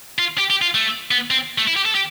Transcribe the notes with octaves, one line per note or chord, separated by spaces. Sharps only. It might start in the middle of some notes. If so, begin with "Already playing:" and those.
F4
G4
G4
F4
A3
B3
C4
A3
E4
G4
A4
G4